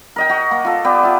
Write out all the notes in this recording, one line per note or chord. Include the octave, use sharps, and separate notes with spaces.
A#4 D#5 G5
F#4
A#3
F4 A4
B3 G4 D5
F4 E5